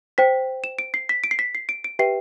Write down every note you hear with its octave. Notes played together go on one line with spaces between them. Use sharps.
C5 G5 B6
E7
D7
C7
B6
D7
C7
B6
C7
D7
D7
G4 B4 E5 G5 C7